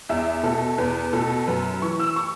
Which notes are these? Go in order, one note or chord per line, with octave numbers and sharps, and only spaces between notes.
E2 E5
B2 A4
E2 B4
B2 A4
F#2 B4
E3 C#6
E6
C#6